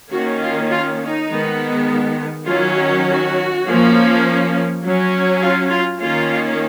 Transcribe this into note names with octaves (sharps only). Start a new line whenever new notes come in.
D#3 A#3 C#4 F#4
F4
F4
D#4
D#3 G#3 B3
D#3 F#3 C#4 F4
F#4
F#4
F3 A#3 C#4
F#3 C#4
F4
F4
D#3 A#3 C#4 F4